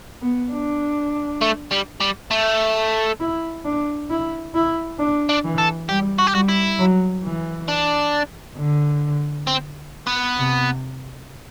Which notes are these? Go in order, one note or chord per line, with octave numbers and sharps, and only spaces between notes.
B3
D4
A3
G3
G3
A3
E4
D4
E4
E4
D4
D4
E3
A4
G3 G4
F#4
G4
G3 F#4
E4
F#3
E3
D4
D3
C4
B3
C3